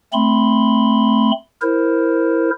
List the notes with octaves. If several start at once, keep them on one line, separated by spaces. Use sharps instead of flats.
A3 C4 B5 C6
E4 A#4 C5